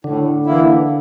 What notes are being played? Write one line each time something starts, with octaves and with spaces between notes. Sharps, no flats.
A2 D3
E3 A#3 E4